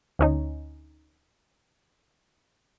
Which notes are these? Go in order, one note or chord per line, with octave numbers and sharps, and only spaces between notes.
D2 C#4 D#4